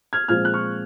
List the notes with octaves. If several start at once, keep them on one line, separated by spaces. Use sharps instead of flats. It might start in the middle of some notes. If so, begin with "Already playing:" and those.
F6 G#6
A#2 F3 G#3 C4 F6 G#6
F#6
C#6 F6